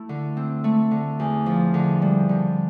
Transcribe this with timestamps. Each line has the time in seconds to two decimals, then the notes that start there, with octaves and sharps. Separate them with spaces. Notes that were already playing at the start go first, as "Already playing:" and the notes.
Already playing: A3 E4
0.09 D3
0.37 C4
0.64 A3
0.91 D3
1.20 E2
1.46 F3
1.74 D3
2.02 G3
2.29 D3